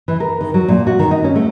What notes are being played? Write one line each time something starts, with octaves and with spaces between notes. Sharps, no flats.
E3
A#4
D#3
F#3
A#2
F#4
D#3
D#4
C#4
A3